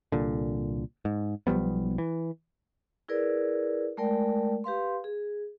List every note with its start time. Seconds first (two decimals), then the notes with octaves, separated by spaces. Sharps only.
0.12 C2 A#2 D3
1.05 G#2
1.47 B1 F3 G3 B3
1.98 E3
3.08 E4 G#4 A#4 B4 D5
3.97 G#3 A3 A#4 D5 G5
4.64 G4 B4 F5 C6
5.04 G#4